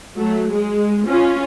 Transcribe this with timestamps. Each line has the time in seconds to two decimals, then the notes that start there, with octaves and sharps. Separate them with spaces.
0.17 F#3 A3
0.51 G#3
1.06 C#4 F4